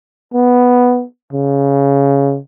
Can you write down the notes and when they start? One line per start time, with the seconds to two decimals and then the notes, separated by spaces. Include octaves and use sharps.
0.34 B3
1.33 C#3